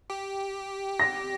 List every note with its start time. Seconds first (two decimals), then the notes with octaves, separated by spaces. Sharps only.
0.10 G4
1.00 A#6